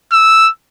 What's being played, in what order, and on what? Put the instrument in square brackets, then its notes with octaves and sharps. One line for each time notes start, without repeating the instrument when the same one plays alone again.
[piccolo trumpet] E6